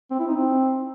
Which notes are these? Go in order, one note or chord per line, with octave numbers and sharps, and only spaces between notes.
C4
E4
D#4
C4